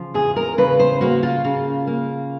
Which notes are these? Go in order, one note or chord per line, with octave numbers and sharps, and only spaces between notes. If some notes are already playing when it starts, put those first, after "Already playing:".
Already playing: C#3 F3
E2 G#4
A#4
C#3 B4
C5
A#3 F#4
F4
C#3
A#3